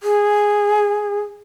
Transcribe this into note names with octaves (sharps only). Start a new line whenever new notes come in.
G#4